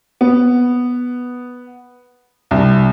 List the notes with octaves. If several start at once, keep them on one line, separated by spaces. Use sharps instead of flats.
B3
C2